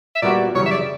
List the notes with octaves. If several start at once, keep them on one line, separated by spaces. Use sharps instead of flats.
E5
A#2 G3 B3 F#4 D5
F#2 C#3 E3 G3 C#5
E5
D5